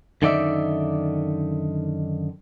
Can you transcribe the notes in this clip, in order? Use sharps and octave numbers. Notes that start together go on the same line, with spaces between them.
F#2 D3 D#3 D#4 D5 E5